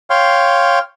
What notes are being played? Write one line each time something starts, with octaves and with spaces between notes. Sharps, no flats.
C#5 F5 G5 C6